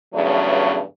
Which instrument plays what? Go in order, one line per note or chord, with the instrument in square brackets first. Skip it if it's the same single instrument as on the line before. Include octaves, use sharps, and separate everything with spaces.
[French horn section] E2 G2 C#3 F#3 A3